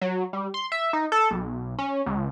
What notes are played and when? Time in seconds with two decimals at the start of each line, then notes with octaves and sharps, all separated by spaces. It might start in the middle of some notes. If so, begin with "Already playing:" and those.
0.01 F#3
0.33 G3
0.54 C6
0.72 E5
0.93 D#4
1.12 A4
1.31 B1
1.79 C#4
2.06 C#2